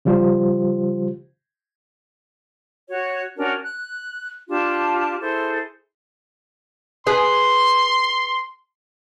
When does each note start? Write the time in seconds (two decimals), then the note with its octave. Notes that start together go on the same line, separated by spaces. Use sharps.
0.05 C#3 F3 G3 F4 G4 C5
2.87 F#4 C#5
3.37 C#4 D4 F#4 A#4
3.62 F#6
4.48 D4 F4 G4 A5
5.20 E4 G#4 A4 C5
7.07 G#4 B4 G#5 C6